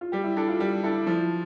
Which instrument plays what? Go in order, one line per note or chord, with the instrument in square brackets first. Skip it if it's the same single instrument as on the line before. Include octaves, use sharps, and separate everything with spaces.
[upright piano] F4
[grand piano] G3 [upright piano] G4
[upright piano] E4
[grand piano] D4 A4 [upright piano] E4
[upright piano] F4
[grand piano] G3 [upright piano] G4
[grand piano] D4 A4 [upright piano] E4
[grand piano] F3 [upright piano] E4